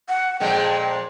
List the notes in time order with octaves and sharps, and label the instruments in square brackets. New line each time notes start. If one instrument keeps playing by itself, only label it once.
[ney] F#5
[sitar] F2 A#2 G#3 [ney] G5